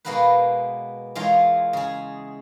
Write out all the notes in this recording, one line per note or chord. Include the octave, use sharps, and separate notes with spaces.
B2 G#3 A#3 B3 A#4 B4
E2 G#3 F4 A#4 C#5
C#3 G#4